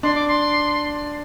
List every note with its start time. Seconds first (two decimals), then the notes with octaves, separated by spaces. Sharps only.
0.03 D4 C6
0.15 D6
0.28 C6